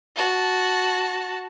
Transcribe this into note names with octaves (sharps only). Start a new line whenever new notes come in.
F#4 A5